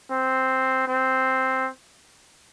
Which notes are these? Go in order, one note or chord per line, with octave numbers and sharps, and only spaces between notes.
C4
C4